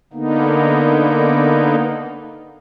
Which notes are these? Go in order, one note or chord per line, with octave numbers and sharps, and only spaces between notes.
D3 A#3 B3 D#4